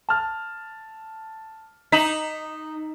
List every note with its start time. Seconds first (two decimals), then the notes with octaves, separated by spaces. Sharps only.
0.09 A5 F6
1.92 D#4 B6 E7 F#7